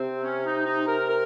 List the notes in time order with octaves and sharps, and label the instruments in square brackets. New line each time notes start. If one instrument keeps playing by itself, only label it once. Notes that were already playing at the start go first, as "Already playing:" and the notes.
Already playing: [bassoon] C3 [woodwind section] C4
[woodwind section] C#4
D#4
D#4
A#4
A#4